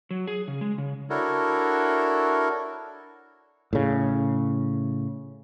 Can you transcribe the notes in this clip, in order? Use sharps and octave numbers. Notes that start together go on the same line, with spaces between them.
F#3
G#4
C#3
G#3
C#3
D4 E4 F#4 A4 A#4 C#5
A2 C#3